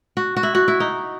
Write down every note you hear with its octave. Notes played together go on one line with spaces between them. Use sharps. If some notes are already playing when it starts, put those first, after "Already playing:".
F#4
F#4
E4
F#4
E4
D#4